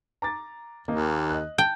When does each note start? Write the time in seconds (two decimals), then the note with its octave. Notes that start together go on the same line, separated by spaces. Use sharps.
0.22 A#5 D6 A6
0.88 D#2 D#3 A#3 D#4
1.30 D#5 F#6
1.58 G5 A5